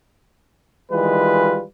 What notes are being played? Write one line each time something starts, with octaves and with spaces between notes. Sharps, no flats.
D#3 E3 G3 G#3 F4 B4